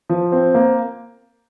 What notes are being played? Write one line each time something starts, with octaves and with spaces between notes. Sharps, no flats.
F3
C4
A#3